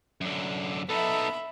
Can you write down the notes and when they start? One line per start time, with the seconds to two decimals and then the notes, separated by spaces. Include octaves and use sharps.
0.21 F#2 D3
0.89 B3 D#4 A4 E5 B5